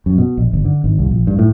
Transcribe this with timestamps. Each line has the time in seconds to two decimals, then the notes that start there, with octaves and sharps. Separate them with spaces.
0.06 F#2
0.18 B2
0.37 A#1
0.53 G1
0.65 D3
0.84 G#1
0.99 C2
1.11 A#1
1.27 G2
1.39 A2